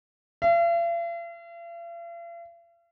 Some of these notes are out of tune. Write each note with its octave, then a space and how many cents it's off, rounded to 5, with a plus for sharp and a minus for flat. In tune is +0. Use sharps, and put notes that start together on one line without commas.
F5 -45